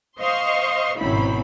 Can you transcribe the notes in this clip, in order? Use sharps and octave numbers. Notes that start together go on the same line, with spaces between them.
C5 D#5 F5 C6 C#6
G#1 F#2 B2 C4 E4 B5